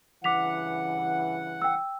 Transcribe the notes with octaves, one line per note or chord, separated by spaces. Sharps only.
G2 C#3 E3 F#5 D6 B6 F7
G5 E6